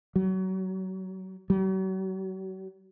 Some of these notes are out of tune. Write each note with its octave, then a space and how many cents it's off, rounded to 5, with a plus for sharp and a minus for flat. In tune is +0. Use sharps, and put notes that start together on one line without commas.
F#3 +30
F#3 +40